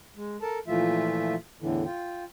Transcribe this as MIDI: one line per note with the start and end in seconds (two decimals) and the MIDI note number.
0.16 0.37 56
0.41 0.58 69
0.41 0.58 70
0.41 0.58 81
0.67 1.35 46
0.67 1.35 52
0.67 1.35 53
0.67 1.35 57
0.67 1.35 65
0.67 1.35 76
1.61 1.84 40
1.61 1.84 45
1.61 1.84 50
1.61 1.84 52
1.85 2.24 65
1.85 2.24 79